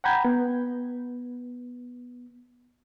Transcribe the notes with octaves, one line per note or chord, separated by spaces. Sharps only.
F#5 G5 A#5 B5 G6 G#6
B3